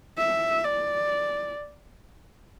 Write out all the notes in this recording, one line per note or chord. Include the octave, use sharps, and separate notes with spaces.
E5
D5